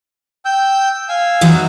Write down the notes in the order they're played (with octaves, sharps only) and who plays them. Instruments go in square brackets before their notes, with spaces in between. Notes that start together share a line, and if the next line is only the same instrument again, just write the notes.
[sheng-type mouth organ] G5 E6 G6
F5 G#5 E6
[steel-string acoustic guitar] E3 F#3 D#4